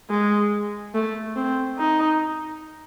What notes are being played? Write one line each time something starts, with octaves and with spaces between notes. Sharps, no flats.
G#3
A3
C4
D#4